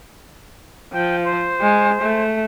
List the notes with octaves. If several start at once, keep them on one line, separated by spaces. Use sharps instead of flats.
F3 G5
C5
G#3
A3